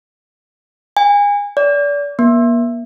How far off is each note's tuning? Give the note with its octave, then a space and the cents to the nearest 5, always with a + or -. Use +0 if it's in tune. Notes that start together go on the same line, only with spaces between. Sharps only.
G#5 -30
D5 -30
A#3 +40